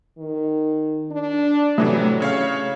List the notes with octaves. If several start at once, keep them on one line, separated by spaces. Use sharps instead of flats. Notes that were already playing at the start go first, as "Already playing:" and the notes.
D#3
D4
A2 C3 E3 F#3 A3
C#3 C#5 F5